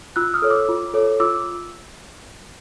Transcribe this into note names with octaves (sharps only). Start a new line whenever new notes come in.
F4 E6 F#6
D#6 F6
A4 C#5
D6 E6
F4
A4 C#5
F4 D6 E6